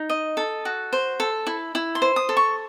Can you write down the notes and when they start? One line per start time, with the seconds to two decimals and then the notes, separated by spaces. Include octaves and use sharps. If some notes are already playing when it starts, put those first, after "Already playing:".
Already playing: D#4
0.10 D#5
0.37 A4
0.65 F#4
0.93 C5
1.20 A4
1.47 E4
1.75 E4
1.95 C6
2.02 C5
2.16 D#6
2.29 A4
2.37 C#6